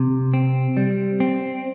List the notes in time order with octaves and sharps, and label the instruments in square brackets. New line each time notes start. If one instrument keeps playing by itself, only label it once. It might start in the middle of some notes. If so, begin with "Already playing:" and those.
Already playing: [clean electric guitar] C3
C4
G3
C4